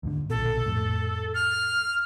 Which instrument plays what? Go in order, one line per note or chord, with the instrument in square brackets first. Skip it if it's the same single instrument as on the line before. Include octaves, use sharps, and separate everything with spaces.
[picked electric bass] D#2 G#2 D3
[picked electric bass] A#1 B2 [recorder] A4
[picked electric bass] F2 A2
[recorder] F6